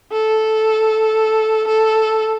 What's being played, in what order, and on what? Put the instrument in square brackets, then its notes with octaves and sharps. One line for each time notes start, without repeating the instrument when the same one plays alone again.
[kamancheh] A4
A4